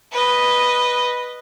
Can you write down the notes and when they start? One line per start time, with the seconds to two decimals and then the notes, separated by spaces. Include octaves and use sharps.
0.12 B4 D#5